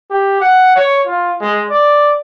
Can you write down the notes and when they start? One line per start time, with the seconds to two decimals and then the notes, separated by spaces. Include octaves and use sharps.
0.11 G4
0.41 F#5
0.76 C#5
1.06 F4
1.41 G#3
1.70 D5